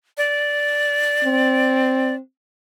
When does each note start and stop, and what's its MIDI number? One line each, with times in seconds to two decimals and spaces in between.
0.18 2.15 74
1.24 2.19 60